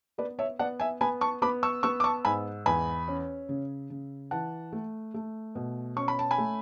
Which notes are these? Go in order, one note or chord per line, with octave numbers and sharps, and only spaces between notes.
B3 B4 D5
C#5 E5
B3 D5 F#5
E5 G#5
B3 G#5 B5
A5 C#6
B3 B5 D6
C#6 E6
B3 C#6 E6
D6
A5 C#6
G#2 G#5 B5
E2 G#5 B5
C#4
C#3
C#3
E3 F#5 A5
A3
A3
B2
C#4 C#6
B5
A5
G#5 B5
A3